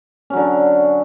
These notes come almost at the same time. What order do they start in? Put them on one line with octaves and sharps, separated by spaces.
C#4 F#3 D3